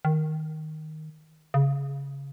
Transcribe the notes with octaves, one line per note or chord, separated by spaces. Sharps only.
D#3
C#3